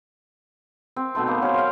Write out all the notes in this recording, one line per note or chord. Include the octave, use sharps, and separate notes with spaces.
C4
B2 D#3 A3 C5
A#3 B3
F#3 C#4 A#4 C5
C5 F5